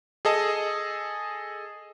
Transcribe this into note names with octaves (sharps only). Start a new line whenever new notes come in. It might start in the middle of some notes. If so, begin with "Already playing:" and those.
G#4 A4 D#5 A5